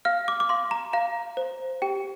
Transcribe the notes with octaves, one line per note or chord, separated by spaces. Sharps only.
F5 F6
D6
D6
F5 C6
A#5
F5 A#5
C5
G4 G5